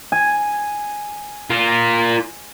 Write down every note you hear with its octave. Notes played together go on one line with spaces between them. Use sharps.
G#5
F4 A#4